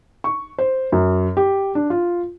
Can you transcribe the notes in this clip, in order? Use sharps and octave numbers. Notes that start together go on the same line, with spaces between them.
C#6
C5
F#2
G4
D4
F4